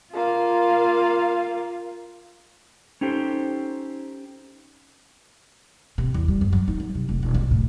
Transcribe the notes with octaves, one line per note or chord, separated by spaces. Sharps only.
A#3 F4 F5
C#4 D#4 G4 A4 C5
C3
E2
G3
F#2
F#3
D#4
F#3
C3
F1
E1
B1
A2